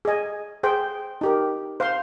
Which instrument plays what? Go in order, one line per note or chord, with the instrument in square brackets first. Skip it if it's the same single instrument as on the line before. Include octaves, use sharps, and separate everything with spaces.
[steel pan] G#4 D#5 G#5
G#4 C5 G5
D#4 G4 A#4
C5 F5 C6